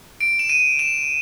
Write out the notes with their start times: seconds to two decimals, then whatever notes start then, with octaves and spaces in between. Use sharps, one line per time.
0.21 D7
0.39 E7
0.49 D#7
0.79 E7